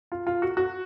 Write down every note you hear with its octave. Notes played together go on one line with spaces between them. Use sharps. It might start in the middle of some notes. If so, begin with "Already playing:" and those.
F4
F4
F#4
F#4